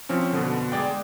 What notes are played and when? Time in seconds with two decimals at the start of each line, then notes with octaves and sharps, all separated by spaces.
0.09 F3 C4 C#4
0.33 F2 B2 D3
0.72 G#3 D5 G5